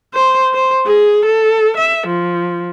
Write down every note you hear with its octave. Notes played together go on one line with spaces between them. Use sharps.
C5
C5
G#4
A4
E5
F3